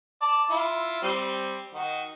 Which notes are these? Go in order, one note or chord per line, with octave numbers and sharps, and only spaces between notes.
D5 A5
E4 F4
G3 C4
D#3 F#4